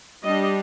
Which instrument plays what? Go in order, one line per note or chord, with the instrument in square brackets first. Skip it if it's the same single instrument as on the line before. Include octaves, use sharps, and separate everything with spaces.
[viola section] G3 D4 D#5